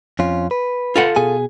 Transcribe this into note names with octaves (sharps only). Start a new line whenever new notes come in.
F2 C#4 F4
B4
F4 A4 F#5
B2 G#4 G#5